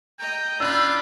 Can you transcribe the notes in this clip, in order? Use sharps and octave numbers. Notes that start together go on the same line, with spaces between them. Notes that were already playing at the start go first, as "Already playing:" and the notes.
D#5 G5 A#5
D4 F4 B5 E6 F#6